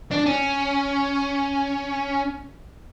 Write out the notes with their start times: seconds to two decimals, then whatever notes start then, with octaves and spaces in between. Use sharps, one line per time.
0.11 D4
0.26 C#4